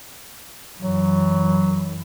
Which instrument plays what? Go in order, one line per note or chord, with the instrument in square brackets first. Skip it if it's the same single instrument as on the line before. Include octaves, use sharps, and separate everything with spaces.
[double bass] F#2 E3 [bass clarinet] F#3